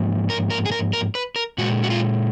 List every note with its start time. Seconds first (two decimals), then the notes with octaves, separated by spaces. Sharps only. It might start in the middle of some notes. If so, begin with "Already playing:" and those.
Already playing: G#2 F3 A#3
0.30 A#4
0.50 A#4
0.66 G#4
0.72 A#4
0.93 A#4
1.15 B4
1.36 A#4
1.58 A#2 G#3 F#4
1.84 F#4
1.90 F4